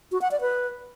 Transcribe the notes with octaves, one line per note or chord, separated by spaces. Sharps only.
F#4
F#5
D5
B4